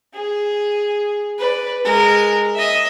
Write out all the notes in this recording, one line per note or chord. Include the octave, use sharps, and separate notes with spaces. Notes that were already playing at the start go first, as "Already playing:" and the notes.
G#4
B4 D5
G#3 A#4
D#5 E5